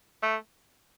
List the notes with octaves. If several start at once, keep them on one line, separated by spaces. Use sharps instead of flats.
A3